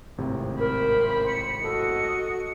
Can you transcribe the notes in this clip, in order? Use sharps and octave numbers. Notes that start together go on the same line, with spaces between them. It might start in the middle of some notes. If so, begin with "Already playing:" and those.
G#1 A2 C3
A#4 C5 B5
C#7
F#4 A4 D#5